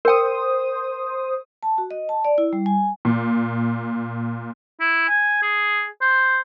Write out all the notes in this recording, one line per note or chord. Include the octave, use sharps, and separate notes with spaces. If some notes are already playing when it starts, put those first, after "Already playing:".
A#4 C5 G5 D#6
A5
F#4
D#5
A5
D5
E4
G3
G#5
A#2
E4
G#5
G#4
C5